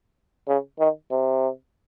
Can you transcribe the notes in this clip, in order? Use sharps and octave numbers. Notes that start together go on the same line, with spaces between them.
C#3
D#3
C3